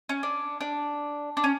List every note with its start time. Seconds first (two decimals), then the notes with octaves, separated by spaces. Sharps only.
0.09 C#4
0.23 D4
0.61 D4
1.37 D4
1.44 C#4